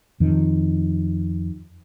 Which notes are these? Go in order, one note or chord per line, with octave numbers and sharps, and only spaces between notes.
F2 D#3